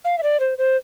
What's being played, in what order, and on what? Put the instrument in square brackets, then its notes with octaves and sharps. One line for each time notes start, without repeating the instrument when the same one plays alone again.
[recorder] F5
E5
D5
C5
C5